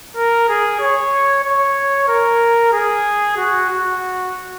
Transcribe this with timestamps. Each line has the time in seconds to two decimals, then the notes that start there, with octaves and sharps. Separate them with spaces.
0.16 A#4
0.49 G#4
0.80 C#5
1.44 C#5
2.08 A#4
2.73 G#4
3.37 F#4
3.69 F#4